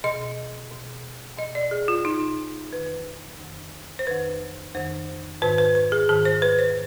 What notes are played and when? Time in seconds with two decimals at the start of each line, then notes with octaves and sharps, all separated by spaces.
0.04 B2 D#5
0.71 B2
1.38 B2 D#5
1.55 D5
1.71 G#4
1.88 F4
2.05 B2 D#4
2.72 F2 D#3 B4
3.40 F2 D#3
3.99 C5
4.07 F2 D#3 B4
4.75 F2 D#3 C5
5.42 G#2 D#3 B4
5.58 B4
5.75 B4
5.92 G#4
6.09 G#2 D#3 G#4
6.25 C5
6.42 B4
6.59 C5